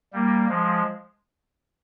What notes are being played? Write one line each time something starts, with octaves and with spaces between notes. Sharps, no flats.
G3 A#3
F3 G#3